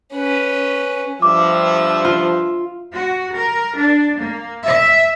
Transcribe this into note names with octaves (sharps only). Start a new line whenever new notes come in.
C#4 B4
G2 F3 E5 D6
F4
F#4
A#4
D4
A#3
E5